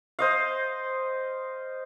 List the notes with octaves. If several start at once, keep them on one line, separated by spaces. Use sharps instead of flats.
C5 D#5 F5